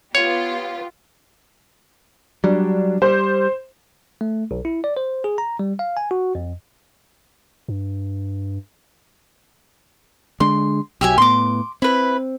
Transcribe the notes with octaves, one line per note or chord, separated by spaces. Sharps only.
B3 F4 G4 C#5
F#3 G3 D4
G3 C5
A3
B1
E4
D5
C5
G#4
A#5
G3
F5
G#5
F#4
F2
G2
D3 G#3 D4 C6
B1 F#3 G4 E5 G#5
A2 B3 C6 D6
C4 E4 B4